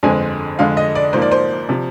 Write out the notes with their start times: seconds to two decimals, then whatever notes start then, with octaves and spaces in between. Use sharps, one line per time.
0.03 G1 F2 D3 G#3 C4 G#5
0.59 F2 D3 G#3 F5
0.77 D#5
0.95 D5
1.13 G#2 F3 A#3 C5
1.22 D5
1.31 C5
1.69 C3 F3